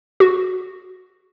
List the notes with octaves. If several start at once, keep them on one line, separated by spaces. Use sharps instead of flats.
F#4